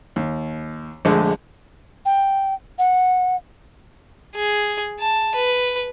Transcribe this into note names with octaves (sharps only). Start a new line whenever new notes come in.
D#2
A#1 D3 G#3 A3
G5
F#5
G#4
A5
B4